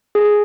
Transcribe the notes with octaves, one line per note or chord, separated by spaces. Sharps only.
G#4